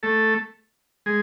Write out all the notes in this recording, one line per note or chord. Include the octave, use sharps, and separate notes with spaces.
A3 A4
G#3 G#4